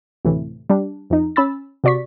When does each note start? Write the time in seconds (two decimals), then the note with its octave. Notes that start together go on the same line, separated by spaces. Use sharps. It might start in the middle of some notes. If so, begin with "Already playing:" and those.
0.25 D2 A2 C3 E3
0.70 G3 D4
1.10 F2 D#4
1.36 C#4 B5 E6 A6
1.84 C3 F#4 D5 C#6 B6